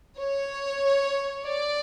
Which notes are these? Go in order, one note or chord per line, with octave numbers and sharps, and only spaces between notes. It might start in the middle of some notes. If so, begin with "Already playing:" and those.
C#5
D5